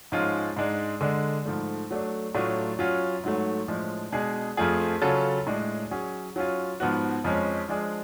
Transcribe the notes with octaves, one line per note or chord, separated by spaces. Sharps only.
G#2 F3 G#3 C#4 F4
G#2 G#3 D4
D3 G#3 D4
G#2 F3 A3
F#3 A3 D4
A2 F#3 A3 D4 F4
F#3 C#4 F4
G#2 F#3 A3
A2 F3 G#3 D4
B2 G#3 D4 G#4
F2 F3 A3 F4 G#4
C#3 F#3 C#4 F4 A4
A2 G#3 D4
F#3 C#4 G#4
F#3 C#4 F4
G#2 F3 B3 F#4
F2 F3 G#3 C#4
F3 G#3 D4 G#4